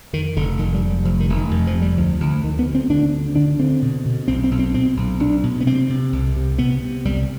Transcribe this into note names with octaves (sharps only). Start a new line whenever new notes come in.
F2 D#3
F1 D3
F1 D#3
G3
C3
G3
F1 F3
D#3
F1
D#3
F2
F3
C3
G3
D2 F3
D2
D2 D#3
B3
D2
C4
D3 D4
D2
D3 D4
D3 C4
B2
B2
B1 C4
C4
B1
C4
B2 C4
B1
B1 D4
B2
B3
C3 C4
C3
C2
C3
C3 B3
C3
C2 G3